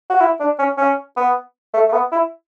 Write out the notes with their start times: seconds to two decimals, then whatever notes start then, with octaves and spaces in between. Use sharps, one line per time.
0.10 F#4
0.20 E4
0.40 D4
0.59 C#4
0.77 C#4
1.17 B3
1.74 A3
1.89 A3
1.92 B3
2.12 E4